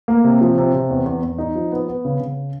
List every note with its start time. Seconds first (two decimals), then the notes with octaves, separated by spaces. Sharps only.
0.08 A#3
0.24 C3
0.41 F3
0.58 C3
0.74 C3
0.91 E2
1.06 E2
1.22 E2
1.38 D#4
1.55 F3
1.72 B3
1.87 B3
2.05 C#3
2.20 C#3